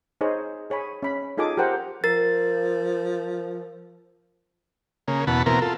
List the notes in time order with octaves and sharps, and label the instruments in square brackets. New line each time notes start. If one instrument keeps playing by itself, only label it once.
[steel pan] D#4 G#4 C5 C#5
G#4 C#5 G#5 B5
C#4 B5
D#4 F4 G#4 A4 G#5 D6
G4 A#4 C5 F#5 G5
[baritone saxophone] F3 [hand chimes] A#4 A6
[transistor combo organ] C#3 A#3
E2 B2 F#5 A5 B5
B2 E3 A#3 C4 A#4
F4 A4